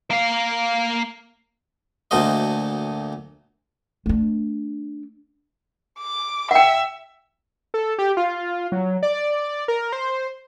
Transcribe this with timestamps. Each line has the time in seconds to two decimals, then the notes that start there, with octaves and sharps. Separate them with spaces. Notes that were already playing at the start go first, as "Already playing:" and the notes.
0.11 A#3 F5
2.11 D2 A#2 A3 F#4 C5 D#5
4.06 A3 D4
5.99 D6
6.51 E5 F#5 G5
7.74 A4
7.98 G4
8.17 F4
8.72 F#3
9.03 D5
9.68 A#4
9.92 C5